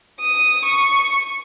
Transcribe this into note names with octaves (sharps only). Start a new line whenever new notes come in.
D#6
C#6